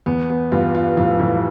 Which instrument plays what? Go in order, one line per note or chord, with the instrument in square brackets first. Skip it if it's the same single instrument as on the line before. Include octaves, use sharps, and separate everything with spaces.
[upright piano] E2 [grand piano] B3
[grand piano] B3
[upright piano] E2 G2 [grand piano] F4
[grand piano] F4
[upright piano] F2 A2 [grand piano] F4
[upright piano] F2 A2 [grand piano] E3